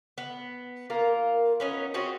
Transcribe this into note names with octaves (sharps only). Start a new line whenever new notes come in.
B3
A#3 F4 A#4
B3 C#4 D#4
C4 C#4 F#4 G#4